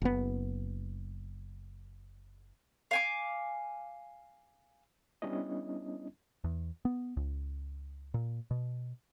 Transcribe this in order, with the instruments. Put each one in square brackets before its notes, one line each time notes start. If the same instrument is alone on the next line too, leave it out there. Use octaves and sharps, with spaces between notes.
[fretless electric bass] F#1 B3
[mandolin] F5 G#5 D6
[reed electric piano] G3 B3 C#4 D4 E4 D#5
[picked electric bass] E2
B3
C#2
A#2
B2